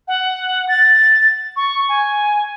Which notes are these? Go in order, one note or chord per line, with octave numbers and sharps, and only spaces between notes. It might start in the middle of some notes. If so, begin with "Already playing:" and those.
F#5
A6
C#6
G#5